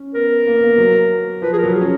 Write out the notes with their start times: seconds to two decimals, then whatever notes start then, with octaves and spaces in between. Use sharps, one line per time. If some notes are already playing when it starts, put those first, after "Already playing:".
Already playing: C#4
0.15 B3 A#4
0.47 A#3
0.55 B3
0.64 A#3
0.78 F#3
1.42 F3 B4
1.53 G#4
1.58 A#4
1.64 F#3
1.74 G#4
1.82 C#4